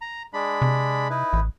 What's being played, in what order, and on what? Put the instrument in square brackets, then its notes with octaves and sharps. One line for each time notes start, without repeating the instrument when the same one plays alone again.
[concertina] A#5
G#3 D4 B5
[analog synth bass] C3
[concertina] D#4 E4 B4
[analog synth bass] A1